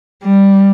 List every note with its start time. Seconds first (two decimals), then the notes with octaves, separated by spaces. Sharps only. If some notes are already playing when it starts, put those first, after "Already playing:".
0.24 G3